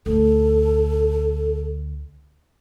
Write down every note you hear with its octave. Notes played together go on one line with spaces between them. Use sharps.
D2 A4